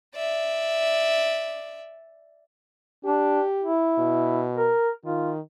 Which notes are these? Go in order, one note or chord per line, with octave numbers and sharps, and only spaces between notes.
D5 E5
D4 G4
E4
B2
A#4
D#3 F4